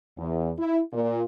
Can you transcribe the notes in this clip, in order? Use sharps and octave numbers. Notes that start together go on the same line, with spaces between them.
E2
E4
A#2